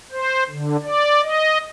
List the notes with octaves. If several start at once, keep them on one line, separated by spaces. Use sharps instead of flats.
C5
D3
D5
D#5